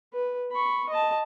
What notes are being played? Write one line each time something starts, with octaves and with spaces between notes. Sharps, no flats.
B4
B5 C#6
D#5 A5